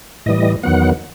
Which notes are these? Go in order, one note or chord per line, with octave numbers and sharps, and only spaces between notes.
A2 E3 G3 D#5
E2 D#3 F#3 B3 F#5